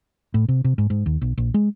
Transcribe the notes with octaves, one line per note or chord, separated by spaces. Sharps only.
A2
C3
C3
G#2
G#2
D#2
B1
A#1
G#3